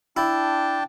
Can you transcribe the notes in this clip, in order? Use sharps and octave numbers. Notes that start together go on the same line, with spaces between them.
D4 E4 G5 A5